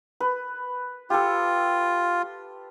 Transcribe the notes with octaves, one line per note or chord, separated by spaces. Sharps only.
B4
F4 G4 A4